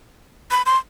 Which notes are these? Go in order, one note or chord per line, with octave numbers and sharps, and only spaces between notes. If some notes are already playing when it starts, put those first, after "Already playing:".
B5
C6